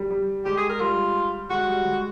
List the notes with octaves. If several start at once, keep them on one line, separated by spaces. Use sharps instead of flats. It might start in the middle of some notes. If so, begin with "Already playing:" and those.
Already playing: G3
G3
G#3 G4
G#4
A#4
G3 F4
G#3 F#4
G3
G#3